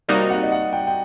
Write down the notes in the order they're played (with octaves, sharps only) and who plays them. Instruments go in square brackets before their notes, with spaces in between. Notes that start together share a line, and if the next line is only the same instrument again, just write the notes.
[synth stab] C3 G3 A#3 D#4 F#4 [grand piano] D5
[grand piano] F#5
D#5
F#5
G5
G5